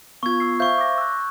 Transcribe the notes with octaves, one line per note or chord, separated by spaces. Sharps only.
B3 F4 C#6 G#6
E6 C7
C5 E5 F5 C#6 G6
D6 A#6
E6 F#6